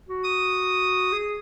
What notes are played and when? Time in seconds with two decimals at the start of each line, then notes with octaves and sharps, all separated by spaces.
0.09 F#4
0.23 D#6
1.12 G#4